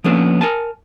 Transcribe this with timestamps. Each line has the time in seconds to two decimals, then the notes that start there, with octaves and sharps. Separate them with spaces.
0.04 F3 A#3 B3 C#4 D4 A4
0.41 A#4 G#5 A5